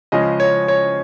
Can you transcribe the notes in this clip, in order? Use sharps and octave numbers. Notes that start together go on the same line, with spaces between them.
C#3 F3 G#3 C#4 D#5
C#5
C#5